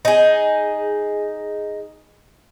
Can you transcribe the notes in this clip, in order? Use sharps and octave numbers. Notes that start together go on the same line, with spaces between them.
D#4 G#4